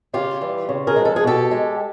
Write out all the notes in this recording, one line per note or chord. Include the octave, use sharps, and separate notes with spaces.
C#3 F4 G4
E3 G3
C#3
G#4 A#4
F3 G#3
A4
G#4
B2 G4 A4
G#3